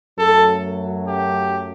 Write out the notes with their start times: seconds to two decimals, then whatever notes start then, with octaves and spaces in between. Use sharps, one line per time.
0.18 F#2 F#3 A3 A4
1.08 G4